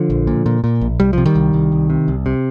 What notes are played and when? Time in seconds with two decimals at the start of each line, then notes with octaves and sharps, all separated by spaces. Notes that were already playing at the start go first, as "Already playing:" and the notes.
Already playing: D3 F3
0.10 A#1
0.27 A#2
0.46 A#2
0.64 A#2
0.81 A#1
1.00 C2 G3
1.13 C3 F3
1.26 D#3 G3
1.35 C2
1.53 C2
1.72 C2
1.90 C3
2.08 C2
2.26 C3